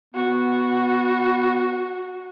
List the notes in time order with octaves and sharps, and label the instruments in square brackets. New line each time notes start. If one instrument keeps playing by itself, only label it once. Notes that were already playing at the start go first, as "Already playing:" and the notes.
[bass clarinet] B3 [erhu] F#4